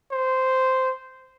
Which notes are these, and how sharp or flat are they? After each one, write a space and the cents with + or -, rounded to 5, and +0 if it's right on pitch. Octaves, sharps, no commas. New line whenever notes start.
C5 -10